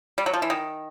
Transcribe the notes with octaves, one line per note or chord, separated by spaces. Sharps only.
G3
F#3
F3
E3
D#3